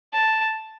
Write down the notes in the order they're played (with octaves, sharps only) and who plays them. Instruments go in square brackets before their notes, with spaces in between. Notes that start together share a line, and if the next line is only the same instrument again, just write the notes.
[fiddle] A5